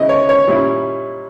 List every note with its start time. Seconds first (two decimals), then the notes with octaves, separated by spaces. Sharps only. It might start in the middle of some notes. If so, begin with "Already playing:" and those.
Already playing: C#3 G#3 E4 D#5
0.09 C#5
0.29 C#5
0.47 A#2 G3 C#4 E4